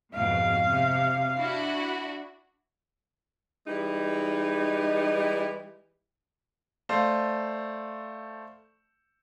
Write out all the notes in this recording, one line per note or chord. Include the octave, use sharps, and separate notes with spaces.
F2 G#2 B2 F5
C3
D4 E4 F#4
E3 G3 G#3 D#4
A3 C5 D5 F5